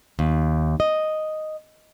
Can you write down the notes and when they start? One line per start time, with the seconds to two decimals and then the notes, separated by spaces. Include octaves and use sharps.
0.19 D#2
0.80 D#5